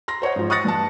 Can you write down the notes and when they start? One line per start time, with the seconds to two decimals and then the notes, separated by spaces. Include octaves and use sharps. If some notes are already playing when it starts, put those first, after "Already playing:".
0.08 A#5 C6 A#6
0.22 C5 C#5 D#5 F#5
0.36 G#2 F3
0.50 C#6 D#6 F#6 A6 A#6 C#7
0.65 G2 A5